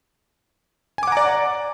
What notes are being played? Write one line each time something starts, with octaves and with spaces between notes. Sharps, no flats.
D5 F#5 G#5 A#5 D6